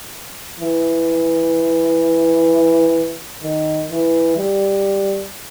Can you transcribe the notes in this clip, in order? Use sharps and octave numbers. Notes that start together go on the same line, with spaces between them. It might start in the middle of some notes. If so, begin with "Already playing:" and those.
E3
D#3
E3
G3